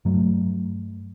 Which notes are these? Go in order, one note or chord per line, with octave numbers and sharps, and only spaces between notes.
G2 F#3 A3